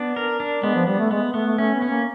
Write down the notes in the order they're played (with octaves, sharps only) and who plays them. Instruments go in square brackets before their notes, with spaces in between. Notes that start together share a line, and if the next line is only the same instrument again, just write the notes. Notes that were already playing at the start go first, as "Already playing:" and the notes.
Already playing: [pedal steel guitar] B3 D4
A#4
D4
[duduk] G#3 [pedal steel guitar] B3
[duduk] F3
[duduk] G3 [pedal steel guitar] B3
[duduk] A3
[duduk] G#3 [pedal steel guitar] B3
[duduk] A3 [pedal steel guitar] B3
[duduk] A3
[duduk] A3 [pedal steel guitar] C#4
[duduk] B3
[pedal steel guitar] C#4
[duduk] A#3